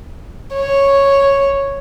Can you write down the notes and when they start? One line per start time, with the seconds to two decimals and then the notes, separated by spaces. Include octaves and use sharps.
0.55 C#5